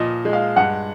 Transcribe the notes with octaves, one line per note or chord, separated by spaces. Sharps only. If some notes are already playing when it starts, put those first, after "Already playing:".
Already playing: A#2 F3 D#5
G#3
F5
G2 F#5